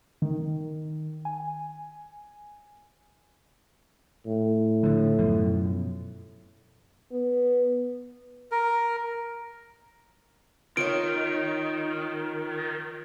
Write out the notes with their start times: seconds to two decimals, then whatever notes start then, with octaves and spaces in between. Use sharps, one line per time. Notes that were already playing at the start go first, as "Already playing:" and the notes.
0.22 D#3
1.25 G#5
4.26 A2
4.83 D3 F3
5.19 F#2 B2 F3
7.12 B3
8.51 A#4
10.77 D#3 F4 C#5 D7